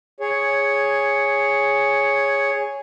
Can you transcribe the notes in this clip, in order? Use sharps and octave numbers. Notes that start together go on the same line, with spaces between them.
G#4 C#5